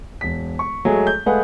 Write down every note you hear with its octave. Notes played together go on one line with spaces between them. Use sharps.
E1 B6
C#6
F#3 G#3 A3 G#4
G6
G#3 A3 G#4 B4 F5 F#5